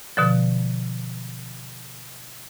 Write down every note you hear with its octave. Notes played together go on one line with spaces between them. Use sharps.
B2 D3 F3